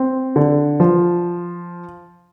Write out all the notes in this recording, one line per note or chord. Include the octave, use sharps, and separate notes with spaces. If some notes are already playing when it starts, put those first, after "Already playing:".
Already playing: C4
D3
F3